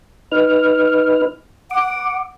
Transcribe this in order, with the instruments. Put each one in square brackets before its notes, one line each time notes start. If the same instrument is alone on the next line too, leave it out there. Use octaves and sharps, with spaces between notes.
[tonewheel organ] D#4 B4 F6
[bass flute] F#5 [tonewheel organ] D6